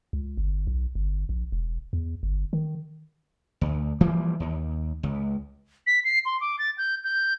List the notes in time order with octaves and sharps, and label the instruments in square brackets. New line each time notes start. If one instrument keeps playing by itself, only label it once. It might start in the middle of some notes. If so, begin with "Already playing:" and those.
[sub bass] C#2
G1
B1
G1
A#1
E1
E2
G1
D#3
[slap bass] D2
E3 F3 G3 A#3
D#2
C#2
[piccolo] B6
C7
C6
D6
A6
G6
G6